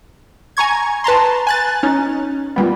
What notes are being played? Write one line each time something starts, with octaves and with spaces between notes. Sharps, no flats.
G#5 A#5 C#6 G#6
B4 A5 A#5 C6
G#5 F#6 A6
C#4 D#4
A#2 G3 B3